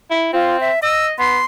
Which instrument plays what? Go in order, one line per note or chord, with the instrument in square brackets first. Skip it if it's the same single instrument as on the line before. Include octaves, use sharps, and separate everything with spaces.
[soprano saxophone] E4
[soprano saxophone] C4 [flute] F4
[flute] E5
[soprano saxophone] D#5 [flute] E6
[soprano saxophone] B3 [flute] C6